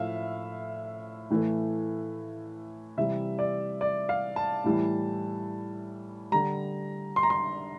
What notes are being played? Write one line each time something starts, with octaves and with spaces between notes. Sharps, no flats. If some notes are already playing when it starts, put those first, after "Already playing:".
Already playing: A2 F3 A3 E5 F5
A2 E3 A3
C3 E3 G3 E5
D5
D5
F5
A5
A2 E3 G3
D3 G3 A#5
C6
A#5
C6